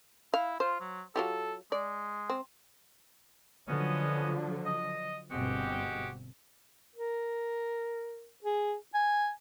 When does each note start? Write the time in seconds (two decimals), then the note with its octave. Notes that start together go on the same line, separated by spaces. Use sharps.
0.34 E4 F5
0.60 F4 C5
0.80 F#3
1.16 F#3 F4 G4 A4
1.72 G#3 D5
2.30 C4
3.68 D3 F3 F#3 B3 C#4 D#5
4.65 D#5
5.31 G1 B2 G#3 C4 F#4 G4
6.96 A#4
8.44 G#4
8.94 G#5